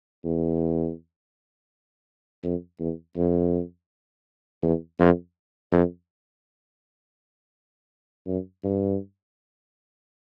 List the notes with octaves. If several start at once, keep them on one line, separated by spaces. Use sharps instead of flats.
E2
F2
E2
F2
E2
F2
F2
F#2
G2